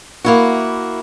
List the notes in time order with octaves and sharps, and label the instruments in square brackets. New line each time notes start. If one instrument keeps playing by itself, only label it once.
[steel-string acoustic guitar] A#3 E4 F#4